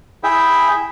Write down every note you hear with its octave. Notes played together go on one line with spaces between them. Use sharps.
E4 G#4 E5 G5